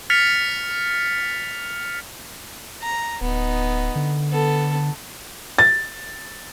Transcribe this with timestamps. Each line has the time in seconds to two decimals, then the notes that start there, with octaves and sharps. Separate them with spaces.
0.10 F6 A6 B6 C#7 F7
2.81 A#5
3.21 D1 B3 D#4
3.96 D3
4.30 B3 A4
5.59 A6